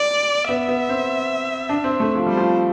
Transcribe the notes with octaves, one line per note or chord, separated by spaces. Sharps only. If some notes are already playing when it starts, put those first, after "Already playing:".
Already playing: D5
B3 E5
B3
C4
D4
C4
A3
F3
G3 C5
F3